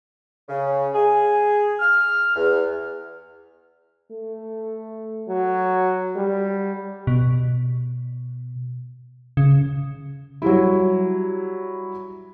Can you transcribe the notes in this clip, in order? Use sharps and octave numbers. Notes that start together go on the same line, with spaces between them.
C#3
G#4
F6
E2
A3
F#3
G3
B2
C#3
F#3 G3 E4